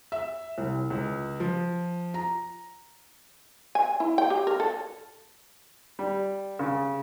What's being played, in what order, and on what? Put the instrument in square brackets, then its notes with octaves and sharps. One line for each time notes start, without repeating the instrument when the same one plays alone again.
[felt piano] E5
C2
C#2
F3
A#5
[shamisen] G#5
E4
G5
G4
A#4
A4
[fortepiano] G3
C#3